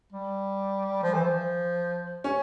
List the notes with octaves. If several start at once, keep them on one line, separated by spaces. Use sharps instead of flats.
G3
F3
E3
F3
C#4